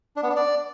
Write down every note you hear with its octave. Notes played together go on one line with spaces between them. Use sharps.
D4
B3
D4
D5